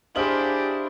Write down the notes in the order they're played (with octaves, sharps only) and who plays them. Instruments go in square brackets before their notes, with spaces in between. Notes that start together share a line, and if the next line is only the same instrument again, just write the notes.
[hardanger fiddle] D4 E4 [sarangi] G4 [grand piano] G#4 F#7 [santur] C5 D#5 F5